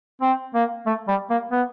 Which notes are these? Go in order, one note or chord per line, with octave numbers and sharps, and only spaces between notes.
C4
A#3
A3
G3
A#3
B3